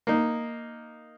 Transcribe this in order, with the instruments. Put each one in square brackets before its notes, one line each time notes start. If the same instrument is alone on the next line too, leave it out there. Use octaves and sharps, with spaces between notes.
[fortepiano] A#3 D#4